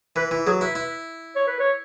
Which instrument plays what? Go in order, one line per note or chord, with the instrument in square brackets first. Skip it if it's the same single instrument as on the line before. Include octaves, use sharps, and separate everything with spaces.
[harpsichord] E3 [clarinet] B4
[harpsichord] E3 [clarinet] E4
[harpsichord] F#3 [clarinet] G#4
[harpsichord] E4 [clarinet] B4
[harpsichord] E4
[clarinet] C#5
B4
C#5